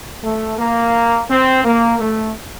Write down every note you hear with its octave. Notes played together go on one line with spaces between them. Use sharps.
A3
A#3
C4
A#3
A3